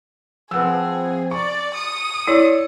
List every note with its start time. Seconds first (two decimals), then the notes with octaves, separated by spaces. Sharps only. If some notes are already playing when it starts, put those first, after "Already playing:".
0.51 F3 C4 G#4 B4 F#5 E6
1.31 D5 C#6
1.74 D#6 C#7
2.28 E4 C#5 D5 E6